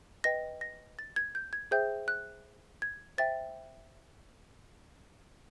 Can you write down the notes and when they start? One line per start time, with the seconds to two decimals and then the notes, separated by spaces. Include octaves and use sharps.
0.24 B4 D#5 G5 A#6
0.61 A#6
0.99 A6
1.16 G#6
1.35 G6
1.53 G#6
1.71 G#4 C5 E5 G5 G6
2.08 F#6
2.82 G#6
3.18 C5 E5 G5 A6